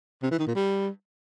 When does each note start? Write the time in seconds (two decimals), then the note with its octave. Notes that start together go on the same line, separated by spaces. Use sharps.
0.23 C3
0.31 E3
0.39 D#3
0.47 A#2
0.55 G3